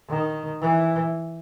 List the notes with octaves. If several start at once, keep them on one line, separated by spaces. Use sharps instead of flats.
D#3
E3